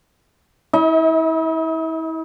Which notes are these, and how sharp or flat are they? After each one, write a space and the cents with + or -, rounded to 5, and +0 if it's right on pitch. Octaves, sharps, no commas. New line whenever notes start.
E4 -35 D#5 +40